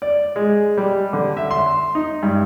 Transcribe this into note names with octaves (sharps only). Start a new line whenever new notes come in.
D5
G#3
G3
D3
E5
C6
D#4
G2